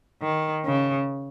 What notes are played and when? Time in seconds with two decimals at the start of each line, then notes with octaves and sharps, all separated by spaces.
0.22 D#3
0.65 C#3